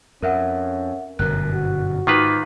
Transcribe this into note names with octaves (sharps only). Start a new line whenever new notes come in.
F2 C#4 A#4 E5 F#5
G1 F#2 B2 A#4 F#6
F#4
G#2 D#3 D#4 F4 B4 D6